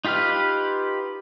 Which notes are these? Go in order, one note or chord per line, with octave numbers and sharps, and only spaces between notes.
D#4 F4 G4 B4 F6